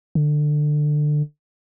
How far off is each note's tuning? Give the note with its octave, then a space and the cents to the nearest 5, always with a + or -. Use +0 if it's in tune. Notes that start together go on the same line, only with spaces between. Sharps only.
D3 +20